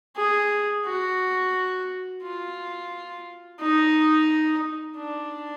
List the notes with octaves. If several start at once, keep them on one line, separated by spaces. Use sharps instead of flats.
G#4
F#4
F4
D#4
D4